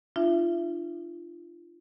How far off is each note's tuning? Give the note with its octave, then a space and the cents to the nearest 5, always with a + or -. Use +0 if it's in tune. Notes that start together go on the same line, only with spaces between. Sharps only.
D4 +30 F4 -25 E5 +30